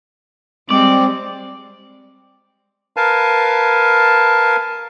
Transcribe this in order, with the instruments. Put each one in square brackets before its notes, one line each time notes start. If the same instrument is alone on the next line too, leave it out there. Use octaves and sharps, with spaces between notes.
[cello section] G3 G#3 [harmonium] C4 [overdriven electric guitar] D5
[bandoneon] A#4 B4 F5 G#5 A5